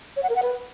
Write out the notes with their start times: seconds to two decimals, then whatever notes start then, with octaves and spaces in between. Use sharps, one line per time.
0.17 C#5
0.23 F#5
0.30 A#4
0.36 F#5
0.43 B4